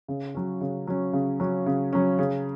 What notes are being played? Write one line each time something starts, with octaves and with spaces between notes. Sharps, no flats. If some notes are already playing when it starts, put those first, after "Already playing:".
C#3
F#3 C#4
C#3
F#3 C#4
C#3
F#3 C#4
C#3
F#3 C#4
C#3